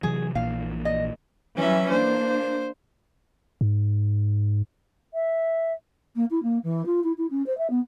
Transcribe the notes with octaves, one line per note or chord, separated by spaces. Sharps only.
C3 E3 F#3 G#4
A#1 A#2 E3 F5
D#5
E3 F#3 G3 C#4 E5
A#3 D4 C5
G#2
E5
A#3
E4
A#3
E3
F4
E4
E4
C#4
C5
E5
B3